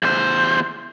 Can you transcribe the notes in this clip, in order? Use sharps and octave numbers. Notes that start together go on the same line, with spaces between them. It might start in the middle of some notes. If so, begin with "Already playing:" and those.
E2 C5